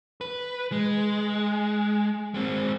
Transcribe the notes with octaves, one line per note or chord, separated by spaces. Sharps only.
B4
G#3
G#3 C4